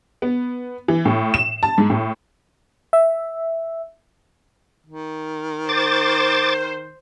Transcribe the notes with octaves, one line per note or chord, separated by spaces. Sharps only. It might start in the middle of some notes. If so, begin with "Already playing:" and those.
B3
E3
A2
E7
A5
G#2
A2
E5
D#3
C5 D6 A6